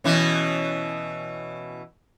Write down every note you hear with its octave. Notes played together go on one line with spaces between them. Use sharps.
B2 E3 C#4